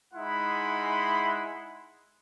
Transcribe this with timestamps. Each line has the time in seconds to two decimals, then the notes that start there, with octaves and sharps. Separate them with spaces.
0.14 G#3 D#4 E4 F#5 B5 C6